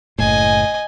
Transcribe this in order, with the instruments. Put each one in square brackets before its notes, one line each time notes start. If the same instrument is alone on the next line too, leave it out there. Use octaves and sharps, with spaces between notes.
[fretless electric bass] F#1 A2 [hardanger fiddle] D#5 G#5